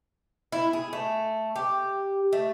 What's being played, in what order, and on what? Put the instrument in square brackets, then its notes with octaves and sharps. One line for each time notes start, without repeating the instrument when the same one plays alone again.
[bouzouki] E4
G#4
A3
G4
A3